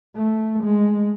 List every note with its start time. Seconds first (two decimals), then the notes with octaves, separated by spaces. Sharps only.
0.16 A3
0.64 G#3